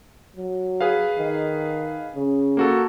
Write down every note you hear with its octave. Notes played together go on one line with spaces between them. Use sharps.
F#3
G#4 B4 F5
D#3
C#3
A#3 F#4 A4